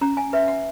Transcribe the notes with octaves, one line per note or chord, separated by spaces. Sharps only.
C#4 A#5
G#5
B4 E5
F#5